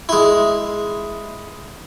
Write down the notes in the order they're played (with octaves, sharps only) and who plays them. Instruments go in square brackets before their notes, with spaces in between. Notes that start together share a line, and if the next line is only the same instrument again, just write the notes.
[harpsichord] G#3 E4